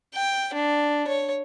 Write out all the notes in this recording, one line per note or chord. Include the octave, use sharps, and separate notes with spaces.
G5
D4
C#5